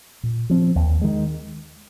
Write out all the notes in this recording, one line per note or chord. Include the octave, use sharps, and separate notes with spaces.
A#2
F3 C4
D#2
D#3 G#3